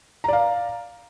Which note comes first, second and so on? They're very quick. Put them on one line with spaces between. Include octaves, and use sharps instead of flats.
A#5 D5 F5